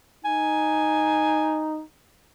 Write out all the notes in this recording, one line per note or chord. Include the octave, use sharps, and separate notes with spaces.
D#4 G#5